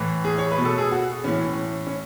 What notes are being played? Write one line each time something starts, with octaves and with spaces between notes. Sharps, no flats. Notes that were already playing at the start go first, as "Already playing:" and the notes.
Already playing: A2 E3
G#4
C#5
B4
B2
A4
G#4
F#4
A2 E3 C#4
C#4